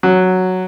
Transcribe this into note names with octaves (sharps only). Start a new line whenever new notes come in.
F#3